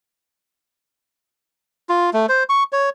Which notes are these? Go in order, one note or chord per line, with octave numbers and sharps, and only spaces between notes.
F4
A3
C5
C#6
C#5